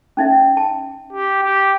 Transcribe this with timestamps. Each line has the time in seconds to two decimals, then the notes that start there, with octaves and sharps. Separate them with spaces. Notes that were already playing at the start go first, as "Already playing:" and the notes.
0.17 C#4 D#4 E5
0.57 A5
1.13 G4
1.43 G4